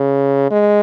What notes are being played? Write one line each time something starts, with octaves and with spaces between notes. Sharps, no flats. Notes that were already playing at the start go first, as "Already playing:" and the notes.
Already playing: C#3
G#3